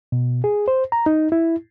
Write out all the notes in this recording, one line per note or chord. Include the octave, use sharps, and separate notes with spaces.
B2
G#4
C5
A#5
D#4
E4